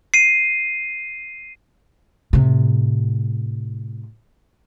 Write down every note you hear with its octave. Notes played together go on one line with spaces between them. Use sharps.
C7 D#7
A2 C3